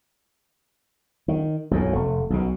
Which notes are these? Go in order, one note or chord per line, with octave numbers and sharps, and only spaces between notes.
D#3
B1 F#2 A2
F1 A3
B1 B2